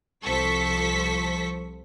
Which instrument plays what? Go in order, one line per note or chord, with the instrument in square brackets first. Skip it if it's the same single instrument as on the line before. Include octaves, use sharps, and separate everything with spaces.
[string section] C2 F3 A4 C5 C#6 B6